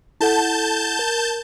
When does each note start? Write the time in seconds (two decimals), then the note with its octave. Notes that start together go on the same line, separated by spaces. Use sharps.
0.21 E4 A4 F#5 A5 G6
0.99 A#4